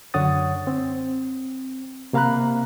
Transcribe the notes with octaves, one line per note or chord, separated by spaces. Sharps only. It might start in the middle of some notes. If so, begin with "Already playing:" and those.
F#2 D3 C#5 F#5 D#6 A6
C4
C3 A#3 F5 A#5 B5 F#6